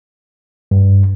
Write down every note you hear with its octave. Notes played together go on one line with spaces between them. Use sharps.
G2